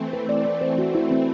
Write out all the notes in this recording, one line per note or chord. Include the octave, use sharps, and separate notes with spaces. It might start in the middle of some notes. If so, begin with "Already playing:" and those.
Already playing: E3 A3 C4
B4
D5
D5
C5
F#4
E4
C4